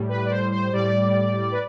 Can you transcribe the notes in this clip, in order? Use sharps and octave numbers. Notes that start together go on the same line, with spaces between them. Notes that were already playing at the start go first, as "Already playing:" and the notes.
Already playing: A2 G3
B4
D5
C5
C5
A2 G3 D5
B4